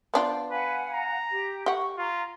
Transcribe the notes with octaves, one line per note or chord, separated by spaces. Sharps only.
B3 D4 F4 C5
B4 F5 F#5 G#5
A#5
G4
G4 F#5 C#6
F4 A#5